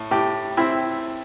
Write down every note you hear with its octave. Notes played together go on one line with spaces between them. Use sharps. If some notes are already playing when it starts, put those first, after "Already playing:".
Already playing: A2
A2 G4
C4 E4